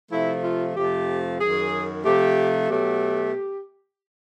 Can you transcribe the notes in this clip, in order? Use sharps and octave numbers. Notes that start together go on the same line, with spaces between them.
C3 F3 A3 E4
F4
F2 C3 F3 A3 G4
F#2 D#3 F#3 G#4
C3 F3 A3 G4
B2 F#3 A3 G4